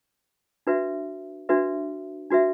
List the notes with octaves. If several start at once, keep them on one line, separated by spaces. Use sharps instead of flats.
D4 F#4 B4 E5
D4 F#4 B4 E5
D4 F#4 B4 E5